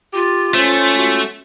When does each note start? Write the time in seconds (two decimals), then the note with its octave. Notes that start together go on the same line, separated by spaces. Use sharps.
0.13 F4 G4
0.54 A3 C#4 C5
0.98 F#4